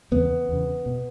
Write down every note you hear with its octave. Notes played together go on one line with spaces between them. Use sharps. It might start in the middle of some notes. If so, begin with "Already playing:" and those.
E2 C#3 B3
E2 C#3
B2